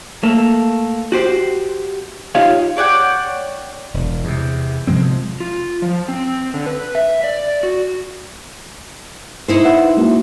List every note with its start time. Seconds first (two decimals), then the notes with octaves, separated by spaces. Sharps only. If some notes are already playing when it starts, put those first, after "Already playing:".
0.23 A3 A#3
1.12 F#4 G4 C5
2.35 D#4 F4 G4 C#5 F5
2.77 C#5 D5 F#5 G5
3.94 E1
4.24 E2 C3
4.87 C3 F3 G#3 C4
5.40 F4
5.82 F3
6.08 C4
6.54 D3
6.66 B4
6.95 E5
7.24 D5
7.63 F#4
9.48 D#4 E4 C5
9.65 B4 E5 F#5
9.97 G#3 A#3 F#4